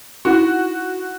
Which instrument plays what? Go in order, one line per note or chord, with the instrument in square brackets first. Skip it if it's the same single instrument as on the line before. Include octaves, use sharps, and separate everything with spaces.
[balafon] D#4 E4 [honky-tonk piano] F#4